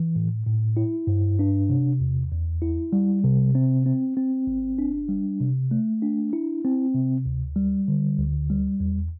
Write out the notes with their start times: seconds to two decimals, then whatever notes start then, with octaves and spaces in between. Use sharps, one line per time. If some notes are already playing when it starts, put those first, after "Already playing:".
Already playing: E3
0.16 A2
0.46 A2
0.77 E4
1.07 G2
1.39 D4
1.69 C3
2.00 E2
2.32 E2
2.62 E4
2.93 G3
3.24 C3
3.55 C4
3.86 C4
4.17 C4
4.47 G1
4.78 D4
5.09 G3
5.41 C3
5.71 A3
6.02 D4
6.33 E4
6.65 C4
6.95 C3
7.26 D2
7.56 G3
7.88 D3
8.19 D2
8.50 G3
8.80 E2